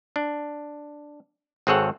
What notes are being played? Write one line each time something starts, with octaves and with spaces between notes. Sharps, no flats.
D4
G#1 C4 G#4 A4 C#5 F#5